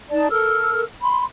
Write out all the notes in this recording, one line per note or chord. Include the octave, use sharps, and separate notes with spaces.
D#4 D5 A5
A4 A#4 E6 F6
B5 C6